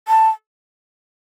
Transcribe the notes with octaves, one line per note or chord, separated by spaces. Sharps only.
A5